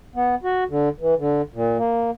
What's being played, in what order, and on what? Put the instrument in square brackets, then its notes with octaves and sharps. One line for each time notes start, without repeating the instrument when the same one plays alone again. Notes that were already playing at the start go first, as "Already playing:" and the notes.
[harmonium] B3
F#4
D3
E3
D3
A#2
A#3